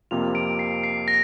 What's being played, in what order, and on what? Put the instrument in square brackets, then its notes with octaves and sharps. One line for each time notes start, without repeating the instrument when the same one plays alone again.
[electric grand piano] F2 C3 A#3 F4 [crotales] F7
[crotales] D7
C7
C7
A#6